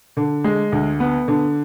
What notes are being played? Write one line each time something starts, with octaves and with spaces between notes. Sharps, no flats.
D3
G#3
D2
B3
D3